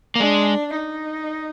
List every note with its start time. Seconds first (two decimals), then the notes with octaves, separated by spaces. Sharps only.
0.16 A#3
0.20 G#3 D4
0.75 D#4